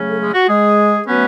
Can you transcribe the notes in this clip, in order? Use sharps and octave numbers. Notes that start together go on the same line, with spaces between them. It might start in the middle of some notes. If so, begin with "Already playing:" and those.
Already playing: C#3 F#3 A3 C#4
A4
G#3 G#4
F#4
G#3 G#4
F#3 A3 B3 C#4 B4